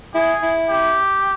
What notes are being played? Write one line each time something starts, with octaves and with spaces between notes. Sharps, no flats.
E4 G#4
E4
G4